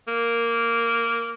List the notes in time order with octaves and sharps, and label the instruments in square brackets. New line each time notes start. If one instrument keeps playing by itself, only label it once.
[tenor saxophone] A#3